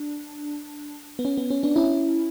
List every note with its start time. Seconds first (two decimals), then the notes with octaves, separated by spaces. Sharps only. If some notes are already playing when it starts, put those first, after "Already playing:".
Already playing: D4
1.19 B3
1.25 C#4
1.37 B3
1.50 C#4
1.63 B3 D4
1.76 C#4 E4